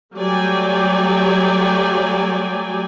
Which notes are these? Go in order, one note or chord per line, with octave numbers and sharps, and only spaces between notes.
F#3 G3 A3 D5 G5 G#5